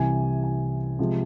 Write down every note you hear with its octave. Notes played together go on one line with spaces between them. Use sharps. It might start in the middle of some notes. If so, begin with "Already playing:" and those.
Already playing: C2 C3 E3 G#5
G#5
C3 F3 G#3